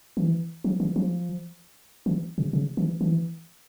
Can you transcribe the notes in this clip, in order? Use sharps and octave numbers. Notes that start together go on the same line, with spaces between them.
E3
F3
E3
F3
E3
C3
C#3
E3
E3